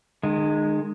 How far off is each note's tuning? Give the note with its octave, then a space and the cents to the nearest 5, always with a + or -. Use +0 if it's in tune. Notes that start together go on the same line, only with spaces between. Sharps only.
D#3 -40 G#3 +0